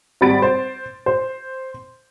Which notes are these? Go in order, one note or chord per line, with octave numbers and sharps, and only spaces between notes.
G#1 G3 B5 A6 D7
C5
C5